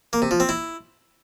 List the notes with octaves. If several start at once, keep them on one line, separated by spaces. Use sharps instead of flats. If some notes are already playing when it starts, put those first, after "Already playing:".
A#3
C3
F3
C4
E4